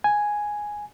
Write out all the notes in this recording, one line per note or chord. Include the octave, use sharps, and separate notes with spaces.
G#5